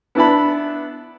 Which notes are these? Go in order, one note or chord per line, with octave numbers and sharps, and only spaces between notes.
B3 D4 E4 A5 B5